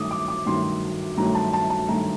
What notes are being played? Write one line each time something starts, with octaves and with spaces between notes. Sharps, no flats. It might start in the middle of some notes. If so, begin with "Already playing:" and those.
Already playing: G2 D#3 F#3 A3 D6 D#6
D6
D6
G2 D#3 F#3 A3 C6
G2 D#3 F#3 A3 A#5
A5
A5
A5
G2 D#3 F#3 A3 A#5